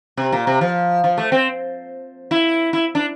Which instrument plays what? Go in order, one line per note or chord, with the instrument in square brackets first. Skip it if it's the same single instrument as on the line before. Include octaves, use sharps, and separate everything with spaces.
[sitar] C3
A#2
C3
F3
F3
A3
C4
E4
E4
D4